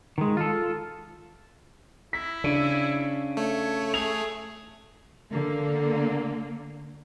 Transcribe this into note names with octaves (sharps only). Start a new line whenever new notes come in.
D#3 G#3
F4 A4
E4 B6
C#3 D4
A3 C#5
G#4 F7
D3 A#3